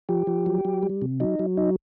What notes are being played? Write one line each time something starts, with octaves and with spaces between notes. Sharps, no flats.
F3 G4
F3
F#3
F#3
G3
C3
F#3 D#4
F#3
D#4